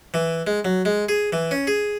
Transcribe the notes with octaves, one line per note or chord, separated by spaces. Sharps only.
E3
G#3
F#3
G#3
G#4
E3
C#4
G#4